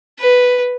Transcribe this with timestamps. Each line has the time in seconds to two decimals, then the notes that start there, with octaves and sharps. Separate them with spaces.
0.19 B4